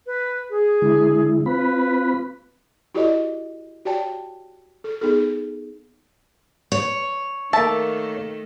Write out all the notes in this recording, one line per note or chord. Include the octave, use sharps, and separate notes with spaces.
B4
G#4
D3 G#3 E4
C4 F4 B4 B5
E4 F#4 G4 A4 D5 D#5
F#4 G4 C#5 D5 G5 A5
A4
B3 D#4 G#4 A4
C#5
D#3 A3 A#3 E5 A5